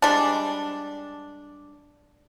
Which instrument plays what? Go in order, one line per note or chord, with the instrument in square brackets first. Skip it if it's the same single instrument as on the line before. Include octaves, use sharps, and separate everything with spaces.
[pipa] G3 G#3 D4